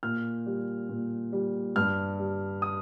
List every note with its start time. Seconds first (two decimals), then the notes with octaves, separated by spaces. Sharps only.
0.03 A#2 F6
0.46 G3
0.89 A#2
1.33 G3
1.76 G2 F6
2.19 G3
2.62 D#6